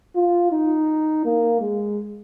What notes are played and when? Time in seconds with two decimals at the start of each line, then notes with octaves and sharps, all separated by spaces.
0.16 F4
0.52 D#4
1.25 A#3
1.61 G#3